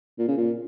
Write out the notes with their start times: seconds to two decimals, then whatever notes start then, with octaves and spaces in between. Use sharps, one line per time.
0.18 A#2
0.28 C#3
0.37 A#2